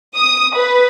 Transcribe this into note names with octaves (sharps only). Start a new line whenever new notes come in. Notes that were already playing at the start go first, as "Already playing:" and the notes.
D#6
B4